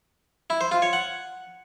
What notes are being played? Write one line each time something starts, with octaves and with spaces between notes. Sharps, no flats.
E4
C5
F4
C#5
F#5